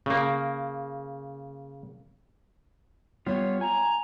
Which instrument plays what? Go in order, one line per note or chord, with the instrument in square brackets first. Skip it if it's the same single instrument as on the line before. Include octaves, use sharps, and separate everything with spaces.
[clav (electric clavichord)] C#3 A#3
[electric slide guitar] G3 B3 F4 [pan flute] C#5
[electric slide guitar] G#5 [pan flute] A#5